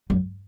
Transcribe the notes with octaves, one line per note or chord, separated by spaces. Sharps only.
F#2